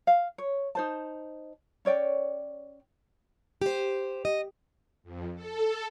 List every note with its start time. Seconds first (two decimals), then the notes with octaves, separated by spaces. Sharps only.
0.07 F5
0.38 C#5
0.75 D#4 C5 A5
1.85 C#4 C#5 D5 G5
3.61 G4 C5
4.25 D#5
5.03 F2
5.35 A4